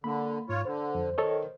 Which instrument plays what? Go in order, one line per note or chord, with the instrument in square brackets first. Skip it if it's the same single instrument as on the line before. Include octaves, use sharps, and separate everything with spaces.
[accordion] D3 [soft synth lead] A#3 [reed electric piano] B5
[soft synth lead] G#2 [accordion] F4 C#5
[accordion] D3 [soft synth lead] C5
[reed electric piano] F2
[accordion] D#3 [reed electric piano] A4 C#5 D#5